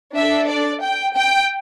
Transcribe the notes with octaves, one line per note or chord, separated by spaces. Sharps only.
D4 A4 E5
D5
G5
G5